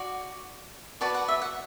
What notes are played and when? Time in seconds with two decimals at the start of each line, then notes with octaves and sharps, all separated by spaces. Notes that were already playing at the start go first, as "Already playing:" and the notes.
Already playing: F#4 D5
1.01 F#4 B4 D5 A5
1.15 F#5
1.28 E5
1.42 F#5